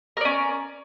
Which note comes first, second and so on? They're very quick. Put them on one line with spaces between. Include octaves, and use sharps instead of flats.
A#4 D5 C#4